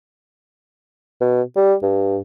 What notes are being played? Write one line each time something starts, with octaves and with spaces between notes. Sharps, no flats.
B2
G3
G2